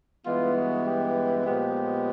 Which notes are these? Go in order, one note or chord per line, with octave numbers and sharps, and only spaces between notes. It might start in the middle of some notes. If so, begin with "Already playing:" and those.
G2 E3 G#3 B3 F4
F#4
G4
A#2 F3 G#3 B3 G4